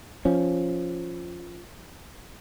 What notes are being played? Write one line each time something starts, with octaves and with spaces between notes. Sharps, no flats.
F3 C#4